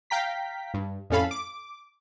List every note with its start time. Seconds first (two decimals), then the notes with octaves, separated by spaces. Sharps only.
0.10 F5 G5 A#5 B6
0.74 G2
1.10 F2 A2 C#4 A4 F5 B5
1.31 D6